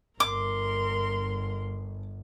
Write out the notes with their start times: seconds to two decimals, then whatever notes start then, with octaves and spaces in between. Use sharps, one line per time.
0.20 G1 A#4 C6 D6